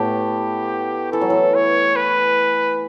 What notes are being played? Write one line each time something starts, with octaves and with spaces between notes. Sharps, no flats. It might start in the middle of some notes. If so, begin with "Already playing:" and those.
Already playing: A2 A3 B3 G4
E3 A4
F#3
E3
C#5
B4